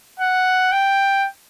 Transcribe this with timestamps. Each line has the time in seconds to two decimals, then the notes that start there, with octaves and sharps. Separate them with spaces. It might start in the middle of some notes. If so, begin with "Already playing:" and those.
0.20 F#5
0.72 G5